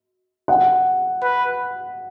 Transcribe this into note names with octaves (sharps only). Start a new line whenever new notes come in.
F#5
B4